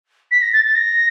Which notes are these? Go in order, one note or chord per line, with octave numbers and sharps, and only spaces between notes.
B6
A#6
A6
A6
A#6